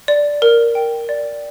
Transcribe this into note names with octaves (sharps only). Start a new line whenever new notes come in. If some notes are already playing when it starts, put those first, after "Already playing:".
D5
A#4
G5
D5